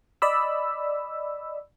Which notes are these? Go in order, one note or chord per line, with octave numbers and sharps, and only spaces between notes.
D5 D#5 B5 E6